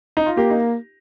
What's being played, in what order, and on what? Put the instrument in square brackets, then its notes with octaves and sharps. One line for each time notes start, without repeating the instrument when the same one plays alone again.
[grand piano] D#4
F4
[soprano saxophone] A#3 [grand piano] G4
[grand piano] D#4